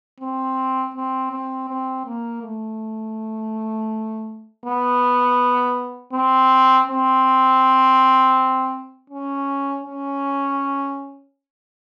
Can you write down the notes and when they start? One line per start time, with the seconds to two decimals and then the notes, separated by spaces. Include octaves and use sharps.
0.20 C4
0.94 C4
1.32 C4
1.69 C4
2.06 A#3
2.42 A3
4.66 B3
6.13 C4
6.88 C4
9.10 C#4
9.84 C#4